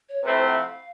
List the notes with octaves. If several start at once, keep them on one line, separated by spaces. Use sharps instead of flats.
C#5
C3 F3 A3 C4 E4 B4
C5
F#5
F5